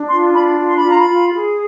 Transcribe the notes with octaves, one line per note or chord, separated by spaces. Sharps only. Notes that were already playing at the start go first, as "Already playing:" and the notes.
Already playing: D4
F4 C6
D4 B5
F4
C6
B5
F4
A#5
B5
F4
G#4